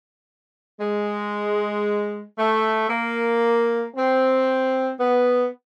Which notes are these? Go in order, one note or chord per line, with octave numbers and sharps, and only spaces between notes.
G#3
A3
A#3
C4
B3